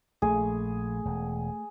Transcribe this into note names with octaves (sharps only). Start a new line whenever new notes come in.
A#1 A3 G#4
E1